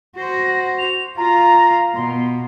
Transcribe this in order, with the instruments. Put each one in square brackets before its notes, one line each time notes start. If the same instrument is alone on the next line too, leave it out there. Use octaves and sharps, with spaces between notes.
[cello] F#4 C5 [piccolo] A#6
[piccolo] F7
[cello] F4 F5 [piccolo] A#5
[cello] B2 [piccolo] C6